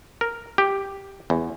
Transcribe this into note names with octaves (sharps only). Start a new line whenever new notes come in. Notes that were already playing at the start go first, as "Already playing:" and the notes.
A#4
G4
E2